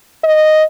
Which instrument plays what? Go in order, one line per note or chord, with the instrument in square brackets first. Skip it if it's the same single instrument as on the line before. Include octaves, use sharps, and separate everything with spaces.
[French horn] D#5